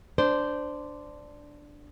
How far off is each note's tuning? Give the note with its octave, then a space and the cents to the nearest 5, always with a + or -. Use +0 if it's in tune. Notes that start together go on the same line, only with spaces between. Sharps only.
D4 +0 C5 -10